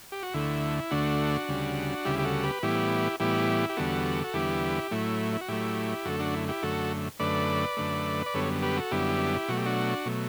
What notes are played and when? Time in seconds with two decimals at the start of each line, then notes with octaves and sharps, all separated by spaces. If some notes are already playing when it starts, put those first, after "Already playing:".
0.12 G4
0.23 F#4
0.34 D2 D3 A3 E4
0.91 D2 D3 A3 D4 F#4
1.48 D2 C#3 G3
2.05 D2 C#3 G3 E4 G4
2.19 G4
2.25 F#4 A4
2.43 G4 B4
2.63 A2 E3 G3 B3 E4 G4
3.20 A2 E3 G3 B3 E4 G4
3.69 G4
3.77 E2 D3 G3 B3 F#4 A4
4.24 F#4
4.34 E2 D3 G3 B3 E4 G4
4.91 A2 F#3 A3 E4
5.33 E4
5.41 F#4
5.48 A2 F#3 A3 E4 G4
6.05 F#2 D3 A3 F#4 A4
6.19 D4 F#4
6.34 E4
6.49 E4 G4
6.62 F#2 D3 A3 F#4 A4
7.19 F#2 D3 A3 B4 D5
7.77 F#2 D3 A3
8.26 D5
8.34 F#2 D3 G3 B3 A4 C#5
8.62 G4 B4
8.77 F#4 A4
8.91 F#2 D3 G3 B3 E4 G4
9.48 B2 F#3 A3 F#4
9.57 G4
9.66 D4 F#4
10.05 B2 F#3 A3